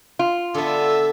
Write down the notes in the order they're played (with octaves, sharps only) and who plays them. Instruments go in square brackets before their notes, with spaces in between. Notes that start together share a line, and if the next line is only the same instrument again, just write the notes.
[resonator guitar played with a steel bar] F4
[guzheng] D3 B3 [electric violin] A4 E5